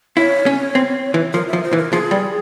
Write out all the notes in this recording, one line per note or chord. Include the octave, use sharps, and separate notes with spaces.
E4 C#5
C#4
C4
E3
F3 A#4
E5
F3
C5
E3
A#4
F3 G#4
G3